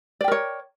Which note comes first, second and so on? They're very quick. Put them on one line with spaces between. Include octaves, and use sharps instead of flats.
D5 G5 A#4 C#5